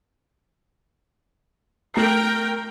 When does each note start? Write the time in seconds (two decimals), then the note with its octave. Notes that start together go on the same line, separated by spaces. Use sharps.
1.94 A3 A#4 G5 A#5 C7